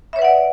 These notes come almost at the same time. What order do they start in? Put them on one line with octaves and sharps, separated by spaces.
E5 C#5 B4 F#5 D5